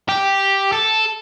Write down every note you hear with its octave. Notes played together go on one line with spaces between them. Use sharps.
G4
A4